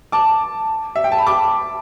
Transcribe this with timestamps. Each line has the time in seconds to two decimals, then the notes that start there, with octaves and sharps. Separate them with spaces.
0.12 A5 D6
0.96 E5
1.04 G5
1.12 A5
1.18 B5
1.26 A5 D6